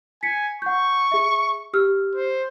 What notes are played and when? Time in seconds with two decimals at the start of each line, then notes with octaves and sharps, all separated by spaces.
0.23 G#5 B6 C#7
0.62 F#5 C#6 G6
1.12 G#4 E5
1.73 G4 E6 F6
2.16 C5